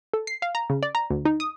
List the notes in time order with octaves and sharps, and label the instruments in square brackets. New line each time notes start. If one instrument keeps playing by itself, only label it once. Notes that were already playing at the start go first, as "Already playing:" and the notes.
[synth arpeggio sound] A4
C7
F5
A#5
C#3
D5
A#5
D2
D#4
D#6